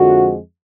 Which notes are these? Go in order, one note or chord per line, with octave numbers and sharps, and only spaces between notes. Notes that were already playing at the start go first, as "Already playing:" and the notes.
Already playing: F2 D3 F3 G#3 F#4